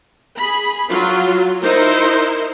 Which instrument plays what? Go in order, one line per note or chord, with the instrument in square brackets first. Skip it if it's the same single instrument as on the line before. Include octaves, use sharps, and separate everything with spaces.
[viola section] G#4 B5
F#3 F4
D#4 E4 A#4 C5